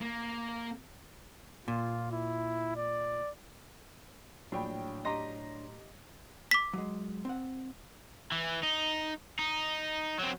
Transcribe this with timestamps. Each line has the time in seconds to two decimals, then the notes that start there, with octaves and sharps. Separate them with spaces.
0.01 A#3
1.68 A#2 F4
2.12 E4
2.76 D5
4.52 A#1 A2 F#3 D4 C#5 G5 B5
5.05 G4 D#5 A#5 C6 A#6
6.51 D6 B6
6.73 F#3 G#3
7.25 C4 F#5
8.32 E3
8.63 D#4
9.39 D#4
10.19 F#3 C4